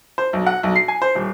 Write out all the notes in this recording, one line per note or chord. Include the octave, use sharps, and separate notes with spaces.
C5
B1
F#5
B1
C7
G#5
C5
D#1